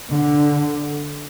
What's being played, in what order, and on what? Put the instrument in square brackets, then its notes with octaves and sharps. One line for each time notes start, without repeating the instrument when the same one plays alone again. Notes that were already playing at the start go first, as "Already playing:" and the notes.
[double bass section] D3